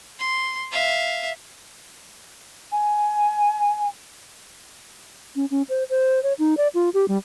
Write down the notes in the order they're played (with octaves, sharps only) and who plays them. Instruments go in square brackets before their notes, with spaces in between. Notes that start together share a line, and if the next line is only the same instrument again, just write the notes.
[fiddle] C6
E5 F5
[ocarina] G#5
[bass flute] C#4
C#4
C5
C5
C#5
D#4
D5
F4
G4
G3